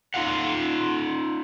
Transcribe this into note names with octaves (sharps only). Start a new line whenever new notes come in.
D#4 F4 F5 F#5